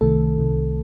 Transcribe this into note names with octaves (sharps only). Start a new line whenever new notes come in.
C2 C3 D#3 A3 A4
C2 C3 D#3